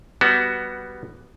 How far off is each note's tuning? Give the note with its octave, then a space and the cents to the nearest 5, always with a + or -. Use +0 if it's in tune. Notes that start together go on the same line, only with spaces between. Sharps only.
G3 -5 B3 +0 F#4 +15